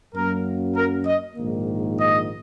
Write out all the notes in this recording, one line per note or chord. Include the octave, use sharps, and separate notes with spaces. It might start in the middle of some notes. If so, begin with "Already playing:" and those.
F#2 F#3 A#3 A#4
A#4
D#5
A#1 G#2 D#3 A#3
D#5